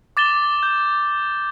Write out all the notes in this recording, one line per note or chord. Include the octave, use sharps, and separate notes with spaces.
D6 A6 E7 G7
G6